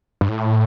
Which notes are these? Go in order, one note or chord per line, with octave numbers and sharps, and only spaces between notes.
G2
A2